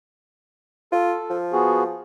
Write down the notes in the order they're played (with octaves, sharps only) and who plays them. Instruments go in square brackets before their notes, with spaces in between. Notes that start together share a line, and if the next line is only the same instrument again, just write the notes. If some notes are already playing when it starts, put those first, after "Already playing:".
[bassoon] F4 [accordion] A4
[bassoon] F3
[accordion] B3 F#4 G#4